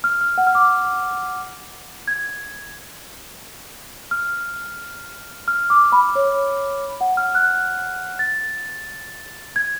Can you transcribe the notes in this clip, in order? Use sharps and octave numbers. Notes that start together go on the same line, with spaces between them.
F6
F6
F#5
F6
D6
G#6
F6
F6
D6
B5
C#5
F#5
F6
F#6
A6
G#6